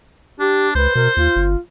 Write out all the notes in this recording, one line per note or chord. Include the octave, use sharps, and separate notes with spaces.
D4 G4
C#2 B4 C5
B2 A#4
D#2 F4
G1